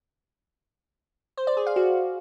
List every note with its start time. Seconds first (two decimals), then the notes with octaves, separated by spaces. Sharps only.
1.37 C5
1.47 D5
1.57 G#4
1.67 F5
1.76 F#4